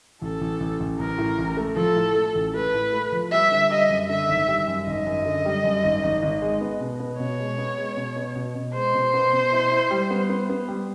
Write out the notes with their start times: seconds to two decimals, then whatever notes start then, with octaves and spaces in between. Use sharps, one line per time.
0.21 A1 A4
0.41 A1
0.60 A1
0.80 A1
0.99 A1 A#4
1.18 A2
1.38 A1
1.57 A3
1.76 F3 A4
1.96 A2
2.15 A3
2.35 A1
2.54 A3 B4
2.74 A2
2.93 A3
3.12 F3
3.31 G3 E5
3.51 D3
3.70 G3 D#5
3.90 F#2
4.09 D3 E5
4.29 G#1
4.48 G3
4.68 F#2
4.87 G#1 D#5
5.07 F#2
5.25 D3
5.45 G3
5.64 F#2
5.84 G#1
6.03 G#1
6.23 G#1
6.42 G#3
6.61 B3
6.80 B2
7.00 B3
7.20 B2 C#5
7.39 G#3
7.58 B3
7.78 G#3
7.97 B2
8.16 B3
8.36 B2
8.55 B2
8.74 G#3 C5
8.94 B2
9.14 B3
9.33 B2
9.52 E4
9.71 E4
9.91 G3
10.10 B3
10.30 B3
10.50 B3
10.68 G3